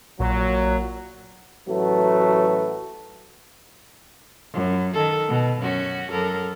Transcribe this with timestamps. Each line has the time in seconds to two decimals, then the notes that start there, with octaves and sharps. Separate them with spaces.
0.20 A#1 A#2 F#3
1.68 A1 F#3 A3 F#4 B4
4.54 F#2
4.93 D#3 A4
5.29 B2
5.61 F#2 C#4 F#4
6.10 F#2 A4 A#4